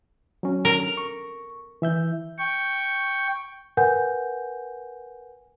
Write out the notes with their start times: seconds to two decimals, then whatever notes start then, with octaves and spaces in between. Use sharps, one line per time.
0.43 F#3 C#4
0.65 A#4
0.97 C#6
1.82 E3 E5 G6
2.38 G5 C#6
3.77 A#4 B4 F#5 G#5 G6